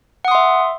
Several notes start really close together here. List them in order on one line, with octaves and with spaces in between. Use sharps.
F#5 D#6 C6 E5